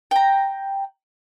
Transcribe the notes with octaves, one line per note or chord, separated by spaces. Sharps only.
G5 A#5